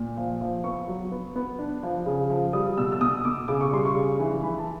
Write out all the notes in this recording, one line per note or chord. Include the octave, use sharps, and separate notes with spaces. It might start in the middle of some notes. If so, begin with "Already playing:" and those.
Already playing: A#2
F3
F3
B3 C#6
F#3
B3
B3
D4
F3
C#3
F3
G3 D#6
B2 E6
E6
B2 D#6
B2 D6
C#3 D6
C#6
G3 C6
C#6
C#3
E3
E3 B5
A5